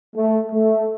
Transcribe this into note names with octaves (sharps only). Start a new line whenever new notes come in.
A3
A3